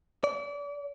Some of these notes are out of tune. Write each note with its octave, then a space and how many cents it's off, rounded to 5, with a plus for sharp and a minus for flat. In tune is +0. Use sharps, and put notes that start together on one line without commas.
D5 -35